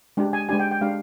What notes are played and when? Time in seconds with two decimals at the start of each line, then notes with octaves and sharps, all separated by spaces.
0.17 G#3 D4 G4
0.33 G#5
0.49 G#3 D4 G4 G#5
0.60 G5
0.71 G5
0.81 G#3 D4 G4 F5